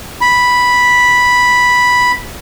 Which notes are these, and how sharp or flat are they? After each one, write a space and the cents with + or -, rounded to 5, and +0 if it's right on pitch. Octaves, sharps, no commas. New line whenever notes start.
B5 -5